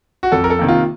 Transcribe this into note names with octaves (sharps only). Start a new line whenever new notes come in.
F#4
F2 A4
A#4
A4
C3 D#3 A#3
F4